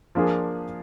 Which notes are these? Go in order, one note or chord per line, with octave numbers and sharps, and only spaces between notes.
F3 A#3 D4 F4 G#4